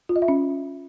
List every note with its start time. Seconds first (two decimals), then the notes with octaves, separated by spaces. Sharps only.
0.09 F4
0.16 D#5
0.22 E5
0.28 C#4